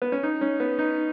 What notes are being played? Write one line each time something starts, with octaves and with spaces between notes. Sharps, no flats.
B3
C#4
D#4
C#4
B3
D#4